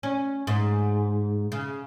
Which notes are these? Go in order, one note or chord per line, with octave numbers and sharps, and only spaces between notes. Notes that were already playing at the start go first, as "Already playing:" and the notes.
C#4
G#2
C#3